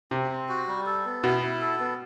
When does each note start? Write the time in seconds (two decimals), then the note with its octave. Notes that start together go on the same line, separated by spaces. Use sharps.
0.11 C3 C4
0.30 C4
0.49 F#4
0.68 G3
0.86 A4
1.05 B3
1.24 B2 E4
1.42 E4
1.61 A4
1.80 B3